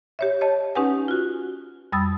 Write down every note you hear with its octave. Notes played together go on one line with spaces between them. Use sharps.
G4 C#5 E5
C#5 D#5 A5
C#4 D#4 G4 B4 F#5 G#5
F4 F#4
F2 G3 B5 D#6 E6 A6